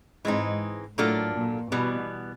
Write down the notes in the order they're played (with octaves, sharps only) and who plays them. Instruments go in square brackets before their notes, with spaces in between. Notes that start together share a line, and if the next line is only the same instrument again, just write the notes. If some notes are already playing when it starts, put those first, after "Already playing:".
[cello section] G#2 [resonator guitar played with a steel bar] E3 G#3 C4 D#4
[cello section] A2 [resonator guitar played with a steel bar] F#3 A#3 D4 F4 A4
[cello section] A#2
[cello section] B2 [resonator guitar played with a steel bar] E3 G3 B3